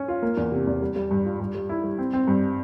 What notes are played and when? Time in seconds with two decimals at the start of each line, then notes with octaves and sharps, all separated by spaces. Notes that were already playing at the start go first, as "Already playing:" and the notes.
Already playing: C#4
0.08 F4
0.22 A#3
0.37 E2
0.52 C3
0.67 E2
0.82 G3
0.96 G3
1.11 G2
1.25 F4
1.40 G2
1.54 G3
1.69 E4
1.84 G3
1.98 C4
2.13 C4
2.27 G2